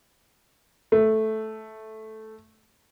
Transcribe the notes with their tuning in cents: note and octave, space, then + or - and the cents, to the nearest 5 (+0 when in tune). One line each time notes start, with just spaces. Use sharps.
A3 -10